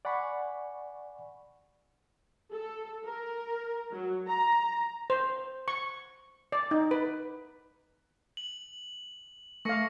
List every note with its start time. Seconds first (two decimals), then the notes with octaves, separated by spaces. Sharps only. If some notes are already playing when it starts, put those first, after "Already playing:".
0.05 D5 F#5 G#5 B5 C#6
2.53 A4
3.05 A#4
3.91 F#3
4.28 A#5
5.10 C5
5.68 C#6
6.52 D5
6.71 D#4
6.91 B4
8.37 F#7
9.65 A3 F5 C#6 A#6 C#7